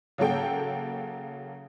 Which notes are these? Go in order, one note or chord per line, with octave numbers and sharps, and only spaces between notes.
C#3 F#3 A#3 A4 G5